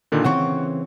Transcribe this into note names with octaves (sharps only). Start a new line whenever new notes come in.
A#2 D3 D#3
C#3 E3 C4 F#5 C#6